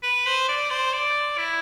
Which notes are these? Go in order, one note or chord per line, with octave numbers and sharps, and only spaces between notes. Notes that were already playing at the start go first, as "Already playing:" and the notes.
B4
C5
D5
C5
D5
E4